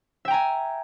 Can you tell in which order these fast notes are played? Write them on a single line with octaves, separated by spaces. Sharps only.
E5 G5 A#5 G#5